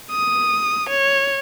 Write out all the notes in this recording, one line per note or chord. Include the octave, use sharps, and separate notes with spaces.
D#6
C#5